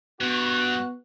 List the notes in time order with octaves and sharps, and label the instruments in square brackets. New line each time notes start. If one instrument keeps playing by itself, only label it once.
[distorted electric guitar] G2 [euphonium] B3 [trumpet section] F#4 [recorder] F#6